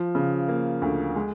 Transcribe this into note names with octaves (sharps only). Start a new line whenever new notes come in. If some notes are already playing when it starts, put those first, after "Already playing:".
Already playing: F3
C#3
A#3
D2
G#3